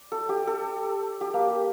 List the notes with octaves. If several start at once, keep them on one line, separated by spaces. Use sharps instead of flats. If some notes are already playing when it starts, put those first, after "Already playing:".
Already playing: D5
A4
G4
A4
G4
A#3